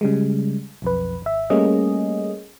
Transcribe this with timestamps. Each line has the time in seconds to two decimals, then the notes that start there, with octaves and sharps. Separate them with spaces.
0.01 C#3 G3 G#3
0.82 B1 F2 B4
1.22 G#1 E5
1.50 G3 A3 A#3 C#4 G#4 D#5